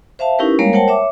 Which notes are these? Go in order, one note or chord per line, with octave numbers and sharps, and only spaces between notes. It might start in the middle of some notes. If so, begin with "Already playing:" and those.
C5 E5 F5 A5
C#4 D#4 E4 G4 A#4 B4
G3 G#3 A#3 A#4 C#5 F5
A#4 C5 C#5 F#5 G5 A5
C#5 E5 D6